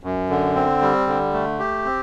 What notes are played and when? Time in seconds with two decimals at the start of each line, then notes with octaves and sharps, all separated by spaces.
0.03 F#2
0.30 D3
0.55 C4
0.81 G3
1.07 D3
1.33 A3
1.59 G4
1.85 C4